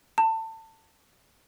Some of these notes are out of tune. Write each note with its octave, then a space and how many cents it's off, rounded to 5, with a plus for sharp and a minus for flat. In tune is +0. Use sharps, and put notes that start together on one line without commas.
A5 +25